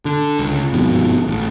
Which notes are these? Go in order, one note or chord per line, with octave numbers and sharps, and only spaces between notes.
D3
C#2
G1 F2 G#2 B2
A1